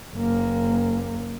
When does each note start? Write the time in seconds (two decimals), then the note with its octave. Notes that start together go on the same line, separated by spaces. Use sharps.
0.15 F#1 A#3